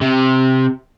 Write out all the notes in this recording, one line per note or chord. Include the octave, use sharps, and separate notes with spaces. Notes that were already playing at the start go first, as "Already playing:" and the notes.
C3